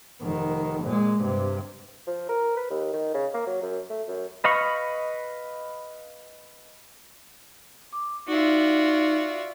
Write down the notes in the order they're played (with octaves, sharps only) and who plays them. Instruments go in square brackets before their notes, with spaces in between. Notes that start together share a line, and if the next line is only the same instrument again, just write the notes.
[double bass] F1 D#3
A#2 G#3
G2 C3
[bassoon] F3
A#4
B4
D#2
D#3
C#3
A#3
F#3
F#2
A3
F#2
[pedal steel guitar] B4 D#5 F5 B5 C#6
[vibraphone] D6
[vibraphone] D#4 [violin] F4 F#4 [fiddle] D5 E5